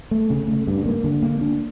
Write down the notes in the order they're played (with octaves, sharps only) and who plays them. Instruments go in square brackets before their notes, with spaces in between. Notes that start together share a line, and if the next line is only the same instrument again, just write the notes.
[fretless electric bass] A3
C#3
A3
G2
A#3
D3
A#3
D4